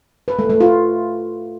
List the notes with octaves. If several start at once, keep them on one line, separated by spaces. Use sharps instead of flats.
B4
A3
A3
F4